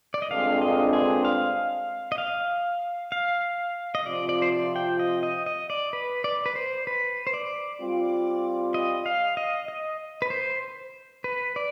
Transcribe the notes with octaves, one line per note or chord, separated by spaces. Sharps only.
D5
D#5
G2 D3 G#3 C4 F4 F5
D#5
G#4
F5
D#5
F5
F5
D#5
C3 F3 C4 F4 D5
D5
C5
D5
G5
D#5
D#5
D#5
D5
B4
D5
B4
C5
B4
C5
D5
G3 C4 F4
D#5
F5
D#5
D#5
B4
C5
B4
D5